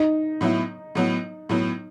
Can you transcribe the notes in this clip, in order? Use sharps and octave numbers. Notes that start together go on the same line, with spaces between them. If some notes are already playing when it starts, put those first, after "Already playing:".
Already playing: D#4
A2 F#3 B3 E4
A2 F#3 B3
A2 F#3 B3